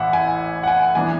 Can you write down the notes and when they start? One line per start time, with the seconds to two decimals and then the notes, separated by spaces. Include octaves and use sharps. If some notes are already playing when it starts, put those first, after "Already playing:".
Already playing: A1 A2 E3 E5 F#5
0.13 G#5
0.63 F#5
0.68 G#5
0.95 E3 B3 D4 G#5